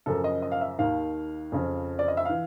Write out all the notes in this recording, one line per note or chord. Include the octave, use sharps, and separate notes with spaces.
F#2 C#3 F3 A4
D#5
D#5
F5
E5
D#2 D#3 F5
F2 C#3 F3
D5
D#5
E5
E3 F5